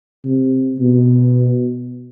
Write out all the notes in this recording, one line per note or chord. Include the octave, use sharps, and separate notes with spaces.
C3
B2